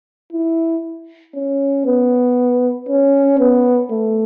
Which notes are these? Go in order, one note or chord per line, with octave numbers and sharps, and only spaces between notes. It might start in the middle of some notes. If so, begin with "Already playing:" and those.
E4
C#4
B3
C#4
B3
A3